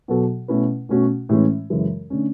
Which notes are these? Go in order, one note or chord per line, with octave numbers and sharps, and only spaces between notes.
B2 F#3 B3 F#4 A4
B2 A3 C#4 E4 B4
B2 A3 C#4 F#4
A2 E3 G#3 C#4
F#2 C#3 E3 G#3
D3 A3 C#4